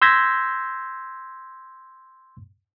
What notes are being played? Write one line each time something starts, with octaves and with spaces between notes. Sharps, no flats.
C6 E6 G6 G#6 A#6 B6